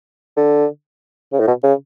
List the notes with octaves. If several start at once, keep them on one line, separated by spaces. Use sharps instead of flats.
D3
C#3
A2
B2
C#3